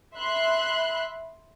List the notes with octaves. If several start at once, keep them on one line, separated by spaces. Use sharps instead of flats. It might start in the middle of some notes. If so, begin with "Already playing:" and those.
E5 B5 C6 F#6